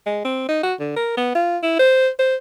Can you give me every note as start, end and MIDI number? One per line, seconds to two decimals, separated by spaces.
0.06 0.22 56
0.24 0.44 60
0.49 0.62 63
0.63 0.74 66
0.80 0.92 50
0.96 1.14 70
1.17 1.33 59
1.35 1.58 65
1.63 1.75 64
1.79 2.09 72
2.19 2.36 72